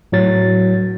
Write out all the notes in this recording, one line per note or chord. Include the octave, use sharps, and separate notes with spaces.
A2 F#3 A6